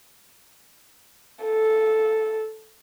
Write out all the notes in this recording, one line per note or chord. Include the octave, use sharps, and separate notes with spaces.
A4